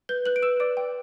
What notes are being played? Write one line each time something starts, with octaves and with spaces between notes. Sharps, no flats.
B4 G6 G7
B4 F#6 F#7
D7
B4 E6 E7
D5 D6 D7
G5